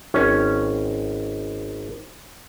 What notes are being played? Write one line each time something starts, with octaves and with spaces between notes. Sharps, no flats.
G#1 C#4